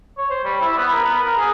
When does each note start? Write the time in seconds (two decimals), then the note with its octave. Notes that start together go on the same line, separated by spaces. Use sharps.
0.17 C#5
0.30 C5
0.44 G3
0.61 E4
0.77 B3
0.92 A#4
1.05 B3
1.22 A#4
1.37 G#4